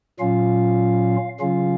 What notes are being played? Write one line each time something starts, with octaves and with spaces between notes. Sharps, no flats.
A#2 F#3 C#4 F4 F5
C#3 F#3 C#4 F4 F5